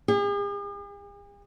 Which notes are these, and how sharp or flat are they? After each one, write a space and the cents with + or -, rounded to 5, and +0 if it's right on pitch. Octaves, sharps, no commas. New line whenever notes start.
G#4 -45